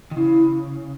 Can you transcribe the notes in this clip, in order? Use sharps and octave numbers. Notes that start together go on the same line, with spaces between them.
D#3
C#3 E4